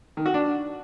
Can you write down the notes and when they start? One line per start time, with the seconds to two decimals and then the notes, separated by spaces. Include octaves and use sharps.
0.17 D#3
0.26 F#4
0.34 D4